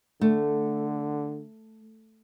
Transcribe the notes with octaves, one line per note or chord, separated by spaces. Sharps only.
D3 A3